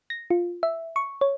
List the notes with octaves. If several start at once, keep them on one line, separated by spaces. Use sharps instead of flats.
A#6
F4
E5
C#6
C#5